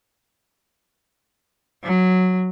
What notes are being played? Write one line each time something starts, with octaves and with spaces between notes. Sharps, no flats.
F#3